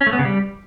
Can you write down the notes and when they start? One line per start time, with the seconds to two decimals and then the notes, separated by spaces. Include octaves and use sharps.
0.01 C#4
0.07 A3
0.13 B3
0.19 C#3
0.25 G3